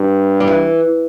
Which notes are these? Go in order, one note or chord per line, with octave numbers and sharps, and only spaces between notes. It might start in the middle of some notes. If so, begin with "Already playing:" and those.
Already playing: G2
G3
E3